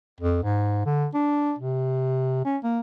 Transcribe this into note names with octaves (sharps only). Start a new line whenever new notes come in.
F2
G#2
D3
D4
C3
C#4
A#3